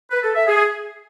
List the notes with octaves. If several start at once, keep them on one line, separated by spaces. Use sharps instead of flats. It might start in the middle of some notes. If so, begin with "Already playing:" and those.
B4
A4
E5
G#4